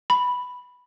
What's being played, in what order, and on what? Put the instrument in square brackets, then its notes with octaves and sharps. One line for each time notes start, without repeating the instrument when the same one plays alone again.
[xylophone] B5